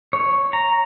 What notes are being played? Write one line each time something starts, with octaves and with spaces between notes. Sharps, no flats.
C#5
A#5